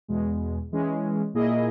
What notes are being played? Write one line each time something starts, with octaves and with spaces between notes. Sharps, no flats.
E2 B2 G#3
E3 G#3 C#4
A#2 A#3 E4 G#4 D#5